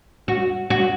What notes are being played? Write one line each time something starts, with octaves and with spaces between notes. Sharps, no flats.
F#4
F#4